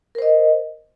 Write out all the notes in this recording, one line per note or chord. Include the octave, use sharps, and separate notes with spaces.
A#4 C5 D#5